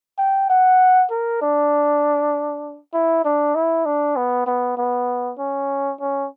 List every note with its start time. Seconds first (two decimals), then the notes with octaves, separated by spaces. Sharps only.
0.18 G5
0.49 F#5
1.11 A#4
1.42 D4
2.93 E4
3.25 D4
3.55 E4
3.86 D4
4.16 B3
4.47 B3
4.78 B3
5.39 C#4
6.00 C#4